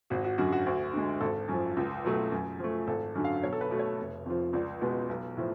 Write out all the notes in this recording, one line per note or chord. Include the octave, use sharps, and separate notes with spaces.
G#1 F#4
F#4
F#2 D3 F#4
F#4
D2
D3 G#3
G#1 A4
F#2 F3
C#2
B2 F#3 A3
F#2
F3 A3
G#1 A4
F#2 D3 F#3
F5
B1 C#5
A4
B4
B2 A3
C#5
F1
F2 F3
C#2 D5
B2 G#3 B3
B1
A2 F3